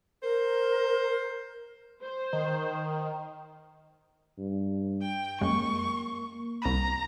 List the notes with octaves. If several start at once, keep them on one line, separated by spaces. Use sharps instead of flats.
A#4 C5
C5
D#3
G2
G5
F#2 G#3 A#3 C#6
C2 A#5 B5